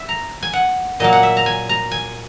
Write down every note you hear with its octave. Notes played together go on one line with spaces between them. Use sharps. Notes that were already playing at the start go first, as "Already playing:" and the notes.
Already playing: E5
A#5
G#5
F#5
A#2 F#3 A#3 D#5
F#5
E5
A#5
G#5
A#5
G#5